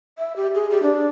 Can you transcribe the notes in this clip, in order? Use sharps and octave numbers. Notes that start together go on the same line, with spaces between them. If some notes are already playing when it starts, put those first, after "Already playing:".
E5
G4
G#4
G4
D4